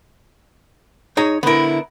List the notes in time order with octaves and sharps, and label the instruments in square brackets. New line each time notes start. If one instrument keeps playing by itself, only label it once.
[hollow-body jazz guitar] D#4 G#4 A#5 [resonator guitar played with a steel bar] C#5
[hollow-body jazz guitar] D3 E4 [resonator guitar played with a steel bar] B3 A#4